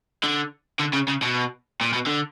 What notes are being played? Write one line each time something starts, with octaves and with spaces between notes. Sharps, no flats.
D3
D3
C#3
C#3
B2
A#2
B2
D3